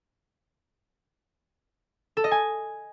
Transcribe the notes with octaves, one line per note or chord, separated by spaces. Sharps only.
A4
D#5
G#5